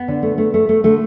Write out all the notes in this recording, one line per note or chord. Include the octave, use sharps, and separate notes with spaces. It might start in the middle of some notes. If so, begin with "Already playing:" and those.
Already playing: B3
D3
A3
A3
A3
A3
D3 A3